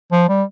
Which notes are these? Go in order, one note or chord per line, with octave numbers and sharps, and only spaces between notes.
F3
G3